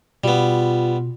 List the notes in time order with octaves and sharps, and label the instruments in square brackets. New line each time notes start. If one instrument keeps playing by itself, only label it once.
[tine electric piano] B2 [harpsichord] G3 B3 [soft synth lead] F4